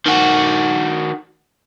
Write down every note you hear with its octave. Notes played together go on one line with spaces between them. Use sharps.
D#3 F#4